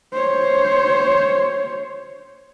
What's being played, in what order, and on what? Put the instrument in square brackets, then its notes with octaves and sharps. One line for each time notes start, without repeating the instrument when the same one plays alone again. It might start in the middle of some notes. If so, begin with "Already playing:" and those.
[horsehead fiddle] C5 C#5